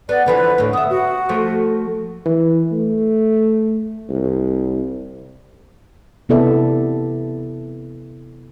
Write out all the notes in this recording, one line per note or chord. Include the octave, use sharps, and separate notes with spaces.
B3 D5
D3 E3 F3 B4
D2 A2
B3 E5 D#6
F#4
F3 A3 C5
E3
A3
C2
C3 B3 E4 A4 D5 E5